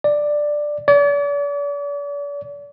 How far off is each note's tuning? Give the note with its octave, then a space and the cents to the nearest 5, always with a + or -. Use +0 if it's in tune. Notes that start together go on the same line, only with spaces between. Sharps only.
D5 +10
D5 -40